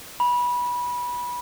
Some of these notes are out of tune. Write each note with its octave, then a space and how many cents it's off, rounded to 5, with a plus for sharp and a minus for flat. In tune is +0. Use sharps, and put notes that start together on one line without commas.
B5 -20